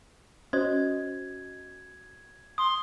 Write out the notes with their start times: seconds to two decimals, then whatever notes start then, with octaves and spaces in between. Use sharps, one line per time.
0.53 C#4 F#4 C5 D#5 G#6
2.58 C6 D#6